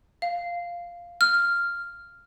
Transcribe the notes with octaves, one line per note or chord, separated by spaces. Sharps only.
F5
F6